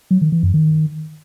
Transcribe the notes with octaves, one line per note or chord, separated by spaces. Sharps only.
F#3
D#3
E3
F#2
D#3